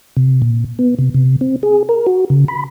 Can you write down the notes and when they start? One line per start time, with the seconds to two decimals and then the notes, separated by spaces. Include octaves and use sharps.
0.17 C3
0.42 A#2
0.79 B3
0.99 C3
1.14 C3
1.41 C4
1.63 G#4
1.89 A#4
2.06 F#4
2.30 C#3
2.48 B5